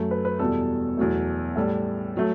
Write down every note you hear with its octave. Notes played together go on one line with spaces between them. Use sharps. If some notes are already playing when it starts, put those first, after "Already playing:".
Already playing: F#2 F#3 A3
B4
B4
E2 B2 G3 A4
E2 B2 F#3 A3
A2 G3 A4
F#3 A3